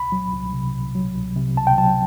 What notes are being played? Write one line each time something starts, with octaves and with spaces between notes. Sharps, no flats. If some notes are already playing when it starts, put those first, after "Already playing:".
Already playing: C2 B5
F#3
C2
C3
C2
F#3
C2
C3
C2 A5
G5
F#3 A5